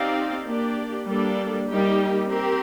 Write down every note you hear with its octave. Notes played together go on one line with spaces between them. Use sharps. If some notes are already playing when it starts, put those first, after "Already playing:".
Already playing: C4 D#4 G4 D5 F5
A#3 D4 G4 D5
G3 A#3 D4 A4 D5
G3 A#3 D#4 G4
C4 G4 A#4